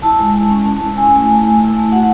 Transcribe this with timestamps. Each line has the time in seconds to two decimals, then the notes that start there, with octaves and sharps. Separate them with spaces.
0.02 E4 A5
0.18 G#3
0.35 G#3
0.50 C#4
0.66 C#4
0.81 E4
0.97 E4 G#5
1.14 A3
1.29 A3
1.45 E4
1.60 E4
1.77 A3
1.92 F#4 F#5